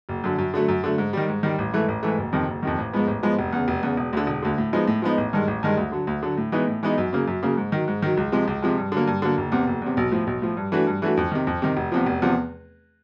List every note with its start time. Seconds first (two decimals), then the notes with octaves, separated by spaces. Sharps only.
0.09 F#1
0.24 F#2 D3
0.38 F#2
0.54 D3 F#3 A3
0.68 F#2
0.84 D3 F#3 A3
0.98 G#2
1.13 D#3 G3
1.28 G#2
1.43 D#3 G3
1.58 A1
1.73 G#2 E3 A3
1.88 A1
2.03 G#2 E3 A3
2.18 F#1
2.32 F2 C3 D#3
2.48 F#1
2.63 F2 C3 D#3
2.78 A1
2.93 G#2 F3 G#3 B3
3.08 A1
3.23 G#2 F3 G#3 B3
3.38 F1
3.53 E2 C#3
3.68 F1
3.83 E2 C#3
3.97 E1
4.13 D2 D3
4.27 E1
4.42 D2 D3
4.58 A2
4.73 F3 G#3 B3 D#4
4.87 A2
5.02 F3 G#3 B3 D#4
5.18 A1
5.33 G2 D#3 G#3
5.48 A1
5.63 G2 D#3 G#3
5.77 D2
5.92 D3 F#3
6.07 D2
6.23 D3 F#3
6.37 A2
6.52 E3 G#3 B3 D#4
6.67 A2
6.83 E3 G#3 B3 D#4
6.98 F#2
7.13 C#3 F#3 A#3
7.27 F#2
7.42 C#3 F#3 A#3
7.57 G#2
7.72 D#3 F#3
7.88 G#2
8.02 D#3 F#3
8.17 C#2
8.32 C3 F3 G#3
8.47 C#2
8.62 C3 F3 G#3
8.77 G2
8.92 D3 F#3 A#3
9.07 G2
9.22 D3 F#3 A#3
9.37 F#1
9.52 E2 C3
9.67 F#1
9.82 E2 C3
9.97 B1
10.12 A2 F3
10.27 B1
10.42 A2 F3
10.57 G2
10.72 E3 A3 D4 F#4
10.87 G2
11.02 E3 A3 D4 F#4
11.17 F2
11.32 C3 D#3
11.47 F2
11.62 C3 D#3
11.77 F1
11.92 E2 C3 F3
12.06 F1
12.22 E2 C3 F3